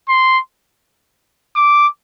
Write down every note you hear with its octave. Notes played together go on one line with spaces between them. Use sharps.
C6
D6